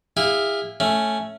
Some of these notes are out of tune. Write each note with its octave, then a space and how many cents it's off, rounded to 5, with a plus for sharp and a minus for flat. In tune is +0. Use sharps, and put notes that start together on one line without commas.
E4 +0 G#4 -40 F5 +0
A3 +0 C#4 +0